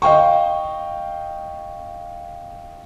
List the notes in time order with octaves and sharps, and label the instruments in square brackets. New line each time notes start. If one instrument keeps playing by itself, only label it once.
[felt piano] D#5 F5 G5 C#6